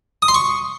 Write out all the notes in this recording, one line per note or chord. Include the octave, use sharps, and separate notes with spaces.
D#6
C6
C#6